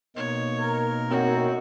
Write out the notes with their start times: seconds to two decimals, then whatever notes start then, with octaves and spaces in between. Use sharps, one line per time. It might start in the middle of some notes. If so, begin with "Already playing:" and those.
0.16 B2 A#3 D#4 C#5
0.58 A#4
1.10 F#2 C4 F#4